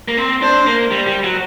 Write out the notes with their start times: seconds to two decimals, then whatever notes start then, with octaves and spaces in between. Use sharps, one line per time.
0.08 A#3
0.17 C4
0.42 D4 C5
0.66 A#3
0.91 G3
1.07 G3
1.24 F#3